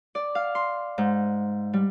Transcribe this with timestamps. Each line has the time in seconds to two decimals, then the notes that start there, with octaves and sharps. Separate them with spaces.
0.15 D5
0.35 F5
0.55 C6
0.98 G#2
1.73 G3